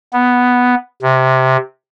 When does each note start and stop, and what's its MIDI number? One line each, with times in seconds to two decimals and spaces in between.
0.13 0.75 59
1.03 1.57 48